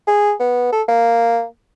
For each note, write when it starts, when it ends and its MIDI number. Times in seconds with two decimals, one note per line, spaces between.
0.07 0.33 68
0.40 0.69 59
0.72 0.82 69
0.88 1.44 58